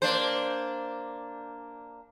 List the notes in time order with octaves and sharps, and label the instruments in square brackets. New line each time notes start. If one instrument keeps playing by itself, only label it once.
[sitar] A#3 D4 C5